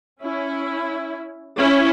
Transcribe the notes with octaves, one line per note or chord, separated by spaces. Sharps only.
C#4 E4
C#4 E4